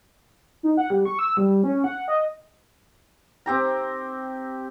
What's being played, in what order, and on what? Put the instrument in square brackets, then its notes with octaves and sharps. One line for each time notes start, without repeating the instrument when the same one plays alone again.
[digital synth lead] D#4
F#5
G3
C#6
E6
G3
C#4
F#5
D#5
[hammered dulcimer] C4 G4 A#5